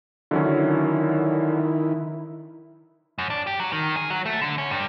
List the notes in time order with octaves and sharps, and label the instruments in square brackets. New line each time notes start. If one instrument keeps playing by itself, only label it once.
[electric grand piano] D3 F#3 C#4 [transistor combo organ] D#3 E4
[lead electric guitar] F#2
D4
G4
F#3
D#3
G#4
F#3
A3
D3
C#4
G2